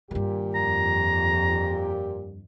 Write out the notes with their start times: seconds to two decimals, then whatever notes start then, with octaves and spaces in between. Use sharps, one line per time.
0.11 G2 A#2 D#3 G4
0.55 F2 A#5